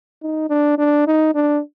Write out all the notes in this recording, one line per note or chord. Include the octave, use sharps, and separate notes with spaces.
D#4
D4
D4
D#4
D4